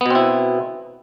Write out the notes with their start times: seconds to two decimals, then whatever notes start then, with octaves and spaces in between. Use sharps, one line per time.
0.01 B3
0.06 B2
0.10 C4
0.15 E4